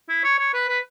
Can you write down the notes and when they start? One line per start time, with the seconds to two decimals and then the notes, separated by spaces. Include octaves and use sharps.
0.09 E4
0.24 C#5
0.39 C#5
0.54 B4
0.69 B4